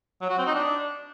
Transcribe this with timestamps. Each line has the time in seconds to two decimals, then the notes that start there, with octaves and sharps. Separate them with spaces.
0.21 F#3
0.30 F#4
0.38 C4
0.46 D#4
0.55 D4